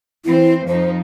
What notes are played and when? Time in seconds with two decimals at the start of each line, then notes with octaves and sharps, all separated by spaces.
0.25 E3 C4 E4 C5
0.68 F2 F3 D#4 C5